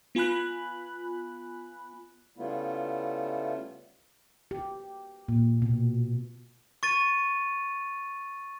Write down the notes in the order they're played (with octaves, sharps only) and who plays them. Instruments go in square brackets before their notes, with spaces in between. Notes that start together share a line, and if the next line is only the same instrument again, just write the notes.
[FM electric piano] B3 F4 G#5 B5 F#6
[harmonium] C#3 G3 A3 B3 E4 F4
[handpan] G4
A#2
B2
[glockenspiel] C#6 A6 D#7